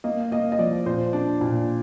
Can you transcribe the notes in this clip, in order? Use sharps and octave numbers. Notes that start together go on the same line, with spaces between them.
A#3 D#5
A#3 D#5
D#5
F3 D5
A#2 C5
D4
A#2